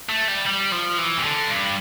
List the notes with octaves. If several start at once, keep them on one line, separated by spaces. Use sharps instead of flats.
A3
G3
G3
F3
E3
C3
D3
G2